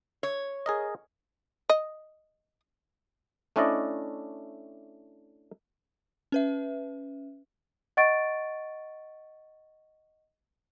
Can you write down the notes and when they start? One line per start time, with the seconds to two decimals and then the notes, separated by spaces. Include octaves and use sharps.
0.23 C#5
0.66 G#4 A#4 D#5
1.69 D#5
3.56 A3 C#4 D4 E4 D5 D#5
6.32 C#4 B4 E5
7.97 D#5 F#5 C#6 A6 D7